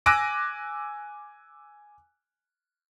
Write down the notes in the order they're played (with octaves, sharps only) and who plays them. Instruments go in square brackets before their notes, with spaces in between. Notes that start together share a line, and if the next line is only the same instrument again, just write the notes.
[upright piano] G#5 D6 E6 F#6 A#6 D7